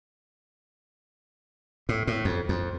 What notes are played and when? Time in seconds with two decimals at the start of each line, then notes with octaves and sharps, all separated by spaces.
1.89 A2
2.07 A2
2.25 F2
2.49 F2